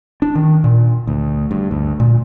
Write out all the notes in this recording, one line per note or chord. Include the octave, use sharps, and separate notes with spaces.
D4
D#3
A#2
D2
G2
D2
A#2